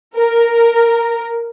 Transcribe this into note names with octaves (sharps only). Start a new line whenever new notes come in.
A#4